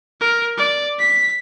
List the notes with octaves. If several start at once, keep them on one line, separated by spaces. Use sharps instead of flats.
A#4
D5
B6